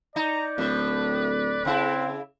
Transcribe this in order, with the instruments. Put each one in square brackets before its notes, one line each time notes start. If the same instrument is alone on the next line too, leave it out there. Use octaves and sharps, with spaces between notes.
[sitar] D#4 [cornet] D5 [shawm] A#5
[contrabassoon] D1 [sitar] A2 [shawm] B4
[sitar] C#3 E4 [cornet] C4